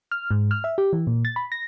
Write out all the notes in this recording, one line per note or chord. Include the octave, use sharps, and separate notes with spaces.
F6
G#2
F6
E5
G4
E3
A#2
A6
B5
A#6